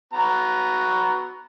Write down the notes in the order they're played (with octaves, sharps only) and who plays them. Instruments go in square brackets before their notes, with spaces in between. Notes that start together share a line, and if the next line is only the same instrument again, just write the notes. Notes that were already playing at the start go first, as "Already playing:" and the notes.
[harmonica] B3 F#4 A#5